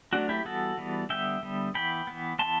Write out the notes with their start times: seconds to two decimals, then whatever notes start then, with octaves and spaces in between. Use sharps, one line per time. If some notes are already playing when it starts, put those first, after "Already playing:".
0.13 F#3 A3 C4 D4 F#4
0.29 E4 G4
0.45 E3 G3 B3 F#4 A4
0.77 E3 G3 B3
1.09 D3 G3 B3 E5 G5
1.43 D3 G3 B3
1.74 E3 B3 G5 B5
2.07 E3 B3
2.39 E3 B3 A5 C6